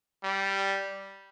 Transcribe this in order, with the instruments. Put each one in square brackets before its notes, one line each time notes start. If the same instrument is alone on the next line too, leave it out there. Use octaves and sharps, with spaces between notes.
[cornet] G3